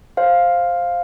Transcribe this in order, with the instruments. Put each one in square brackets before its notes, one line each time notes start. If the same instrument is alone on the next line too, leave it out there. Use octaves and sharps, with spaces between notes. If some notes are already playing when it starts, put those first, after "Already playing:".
[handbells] C5 F5